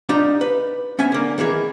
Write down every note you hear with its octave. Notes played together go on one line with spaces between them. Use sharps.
D4 D#4 F4 G4 A#5
B4
B3 C#4 E5 G#5
D3 A#3
D#3 E3 A#3 G#4